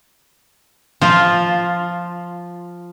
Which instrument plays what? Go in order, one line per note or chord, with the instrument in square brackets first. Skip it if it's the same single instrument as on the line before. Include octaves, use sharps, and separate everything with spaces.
[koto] F3 F4